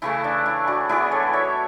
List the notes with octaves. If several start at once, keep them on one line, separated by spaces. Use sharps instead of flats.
C#3 E3 A3 E4
D4
E4
D4 F#4
E3 B3 D4 E4 G#4
A4 C#5
C#5 E5